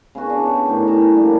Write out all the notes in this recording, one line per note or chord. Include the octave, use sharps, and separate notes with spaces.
C#3 B3 F#4 A5
D4
G4
A2 D#3 G4 A#4
C#4 E5 A5 A#5
G3 A#3 D4